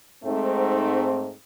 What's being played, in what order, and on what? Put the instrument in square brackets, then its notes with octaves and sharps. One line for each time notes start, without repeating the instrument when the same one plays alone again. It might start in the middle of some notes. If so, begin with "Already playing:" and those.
[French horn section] G#2 A3 C4